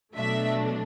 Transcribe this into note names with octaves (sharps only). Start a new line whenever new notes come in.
B2 F#3 A3 D4 E5